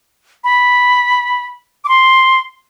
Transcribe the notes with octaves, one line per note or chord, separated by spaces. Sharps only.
B5
D6
C6